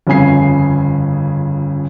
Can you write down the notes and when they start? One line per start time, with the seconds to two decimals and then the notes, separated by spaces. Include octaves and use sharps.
0.07 G1 F2 C#3 G#5 C7